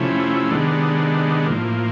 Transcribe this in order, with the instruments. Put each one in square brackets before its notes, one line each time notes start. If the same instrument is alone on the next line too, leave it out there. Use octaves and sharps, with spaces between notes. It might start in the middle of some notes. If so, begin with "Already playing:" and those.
Already playing: [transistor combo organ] C3 F3 A3 C#4 E4
C3 D#3 G#3 B3 D4
A2 F3 A#3